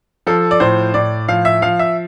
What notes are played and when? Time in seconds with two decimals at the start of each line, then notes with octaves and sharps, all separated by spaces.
0.27 F3 A4
0.51 D5
0.60 A2 C5
0.94 A2 D5
1.28 F3 F5
1.45 E5
1.62 F3 F5
1.79 E5